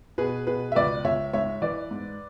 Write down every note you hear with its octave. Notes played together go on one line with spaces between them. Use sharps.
B2 G#4 B4
B2 G#4 B4
E5
C#2 B4 D5
C#2 C#5 E5
G#2 C#5 E5
E3 B4 D5
G#2